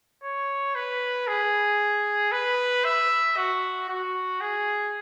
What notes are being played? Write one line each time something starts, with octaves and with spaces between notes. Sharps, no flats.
C#5
B4
G#4
B4
E5
F#4
F#4
G#4